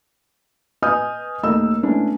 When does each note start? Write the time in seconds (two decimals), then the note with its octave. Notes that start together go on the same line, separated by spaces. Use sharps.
0.82 B4 D#5 G#5 D#6 F6 G6
1.43 D#2 A3 A#4 D#5 E6
1.83 G#3 A3 B3 C#4 D4 E4